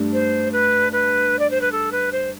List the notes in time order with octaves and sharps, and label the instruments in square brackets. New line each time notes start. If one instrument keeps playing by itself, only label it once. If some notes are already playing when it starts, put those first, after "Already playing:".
Already playing: [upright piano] G2 A3 D4
[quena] C5
B4
B4
D5
C5
B4
A4
B4
C5